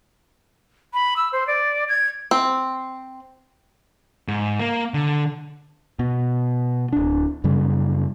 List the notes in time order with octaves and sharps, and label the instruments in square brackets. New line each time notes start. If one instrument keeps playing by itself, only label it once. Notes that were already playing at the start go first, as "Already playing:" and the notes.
[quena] B5
E6
C5
D5
G#6
[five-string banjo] C4
[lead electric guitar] G#2
A#3
D3
[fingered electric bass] B2
D1 D4
F#2 C#3 G3